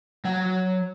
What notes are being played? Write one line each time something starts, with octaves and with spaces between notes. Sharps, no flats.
F#3 F#5